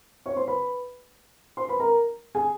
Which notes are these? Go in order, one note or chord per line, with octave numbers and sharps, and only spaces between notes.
C#5 C#6
C5 C6
B4 B5
C5 C6
B4 B5
A#4 A#5
G#4 G#5